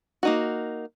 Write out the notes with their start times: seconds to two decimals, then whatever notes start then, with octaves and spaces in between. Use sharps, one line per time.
0.23 A#3 D#4 F#4